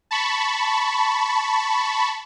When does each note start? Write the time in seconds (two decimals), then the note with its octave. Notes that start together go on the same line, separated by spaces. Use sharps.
0.11 A5 B5 C#6